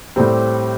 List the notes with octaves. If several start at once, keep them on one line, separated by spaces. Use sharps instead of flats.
A2 G3 C4 G4